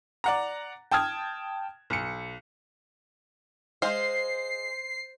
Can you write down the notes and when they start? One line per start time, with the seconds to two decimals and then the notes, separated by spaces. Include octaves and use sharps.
0.24 D5 F#5 A#5
0.91 G5 A5 D#6 F6 G#6
1.90 B1 C#7
3.82 G#3 C5 F5 C7